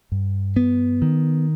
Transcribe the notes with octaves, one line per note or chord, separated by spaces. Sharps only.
G2
B3
D#3